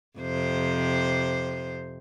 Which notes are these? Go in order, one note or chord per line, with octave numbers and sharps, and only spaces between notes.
F2 C3 C5